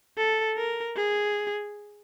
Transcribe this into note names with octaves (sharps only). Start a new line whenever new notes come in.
A4
A#4
G#4